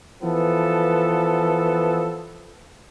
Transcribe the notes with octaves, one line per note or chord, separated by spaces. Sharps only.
E3 F3 B3 A4